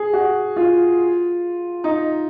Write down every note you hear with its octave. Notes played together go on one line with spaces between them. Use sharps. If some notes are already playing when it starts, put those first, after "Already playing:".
Already playing: G#4
F#4
F4
D#4